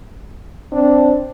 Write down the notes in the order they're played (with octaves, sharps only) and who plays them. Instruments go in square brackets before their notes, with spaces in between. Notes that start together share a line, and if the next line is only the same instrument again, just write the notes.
[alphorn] C4 [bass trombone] D4